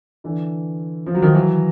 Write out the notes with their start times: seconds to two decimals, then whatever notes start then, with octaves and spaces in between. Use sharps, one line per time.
0.24 D3 E3
1.06 F3
1.15 F#3
1.22 D#3 F3
1.34 E3 F#3